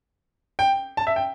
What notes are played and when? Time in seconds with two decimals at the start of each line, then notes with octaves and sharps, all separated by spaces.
0.59 G5
0.97 A5
1.07 E5
1.16 G5